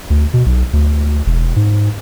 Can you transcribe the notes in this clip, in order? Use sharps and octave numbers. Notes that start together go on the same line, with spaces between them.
D2
B2
B1
D2
E1
G#2